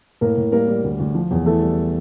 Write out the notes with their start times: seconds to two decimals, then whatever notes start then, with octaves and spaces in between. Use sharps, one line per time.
0.21 A2 A#3 A#4
0.37 A2
0.52 G3 A#3 A#4
0.68 G3
0.84 D2
0.99 D2
1.15 F3
1.31 E2
1.46 E3 A3 A4
1.62 G3